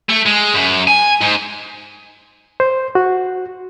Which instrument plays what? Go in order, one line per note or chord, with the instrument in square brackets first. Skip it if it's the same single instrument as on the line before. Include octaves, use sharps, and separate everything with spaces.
[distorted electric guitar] A3
G#3
F#2
G#5
G#2
[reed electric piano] C5
F#4